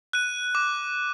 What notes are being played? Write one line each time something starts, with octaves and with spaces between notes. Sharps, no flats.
F#6 D#7
D6